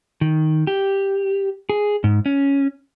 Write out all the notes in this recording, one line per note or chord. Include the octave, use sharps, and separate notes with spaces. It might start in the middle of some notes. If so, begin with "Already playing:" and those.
D#3
G4
G#4
G#2
C#4